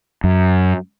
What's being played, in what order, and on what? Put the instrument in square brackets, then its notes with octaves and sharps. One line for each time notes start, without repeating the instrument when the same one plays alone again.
[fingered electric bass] F#2